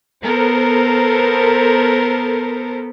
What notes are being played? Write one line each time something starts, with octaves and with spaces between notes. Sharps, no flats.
B3 A4 A#4 C5